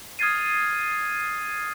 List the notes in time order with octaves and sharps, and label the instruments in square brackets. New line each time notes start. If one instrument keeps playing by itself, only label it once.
[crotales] D#6 F6 G#6 A6 C7 D#7